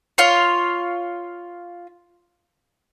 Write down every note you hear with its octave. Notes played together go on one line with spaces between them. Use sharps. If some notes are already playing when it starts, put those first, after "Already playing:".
F4 C#5